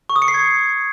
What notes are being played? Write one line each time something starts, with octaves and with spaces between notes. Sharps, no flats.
C#6
D#6
C#7
C7
G#6